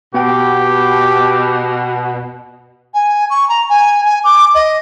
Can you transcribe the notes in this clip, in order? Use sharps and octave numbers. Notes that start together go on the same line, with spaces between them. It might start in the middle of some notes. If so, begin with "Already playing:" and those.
B2 B3 G4 F#5 G5
G#5
C#6
A#5
G#5
G#5
D6
D#5